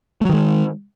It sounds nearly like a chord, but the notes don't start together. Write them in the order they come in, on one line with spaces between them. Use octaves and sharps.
A3 F#3 D#3 G#3